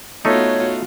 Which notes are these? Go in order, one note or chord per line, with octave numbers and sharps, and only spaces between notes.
A3 B3 D#4 F4 F#4 C#5